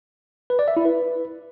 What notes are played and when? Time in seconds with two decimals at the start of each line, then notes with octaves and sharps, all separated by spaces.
0.50 B4
0.59 D5
0.68 E5
0.77 E4
0.85 B4